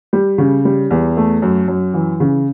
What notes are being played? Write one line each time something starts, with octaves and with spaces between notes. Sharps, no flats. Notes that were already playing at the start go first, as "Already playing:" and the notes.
G3
C#3
G3
E2
A3
F#2
F#2
E3
C#3